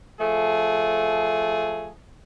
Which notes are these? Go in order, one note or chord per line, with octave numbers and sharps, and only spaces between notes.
F3 A3 G#4